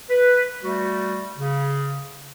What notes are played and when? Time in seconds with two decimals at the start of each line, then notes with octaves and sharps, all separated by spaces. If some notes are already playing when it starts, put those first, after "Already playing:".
0.10 B4
0.62 G3 A3 F#4
1.38 C#3